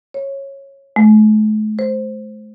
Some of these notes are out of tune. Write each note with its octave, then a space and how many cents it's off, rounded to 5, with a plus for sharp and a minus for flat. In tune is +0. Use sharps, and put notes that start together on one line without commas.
C#5 -15
A3 -45
C5 +0